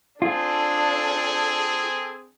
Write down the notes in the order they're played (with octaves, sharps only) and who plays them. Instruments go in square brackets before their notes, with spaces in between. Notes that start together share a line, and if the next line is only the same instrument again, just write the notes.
[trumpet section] C4 G#4 [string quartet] D4 [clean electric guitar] F4 [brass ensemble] A4